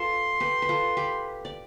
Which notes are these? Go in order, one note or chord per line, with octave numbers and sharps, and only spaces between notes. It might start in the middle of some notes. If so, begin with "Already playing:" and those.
Already playing: F4 A4 B4 C6
G4 B4
B4
F4 A4
G4 B4
D5